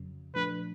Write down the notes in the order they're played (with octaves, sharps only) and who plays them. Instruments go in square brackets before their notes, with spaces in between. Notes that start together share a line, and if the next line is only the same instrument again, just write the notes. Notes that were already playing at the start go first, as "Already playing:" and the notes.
Already playing: [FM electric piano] F2 C#3 F#3
[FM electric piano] A#2 F3 A3 D4 [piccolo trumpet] B4